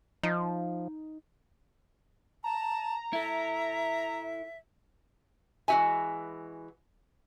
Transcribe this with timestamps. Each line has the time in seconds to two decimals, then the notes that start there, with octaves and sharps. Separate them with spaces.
0.23 F3 D#4
2.44 A5 A#5
3.13 E4 A4 E5
5.68 E3 G#3 F#4 E5 G#5